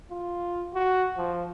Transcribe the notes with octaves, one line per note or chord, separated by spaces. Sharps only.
F4
F#4
F3